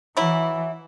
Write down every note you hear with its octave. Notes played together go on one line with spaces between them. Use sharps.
E3 F#3 E4